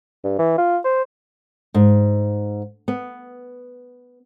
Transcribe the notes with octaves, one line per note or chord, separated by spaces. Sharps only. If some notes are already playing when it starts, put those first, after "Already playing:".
G2
E3
F4
C5
G#2
B3